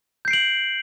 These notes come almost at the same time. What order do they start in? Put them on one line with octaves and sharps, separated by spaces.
G6 C7 D7 F#7